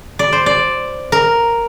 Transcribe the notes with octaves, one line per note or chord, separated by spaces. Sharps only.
D5
C5
D5
A#4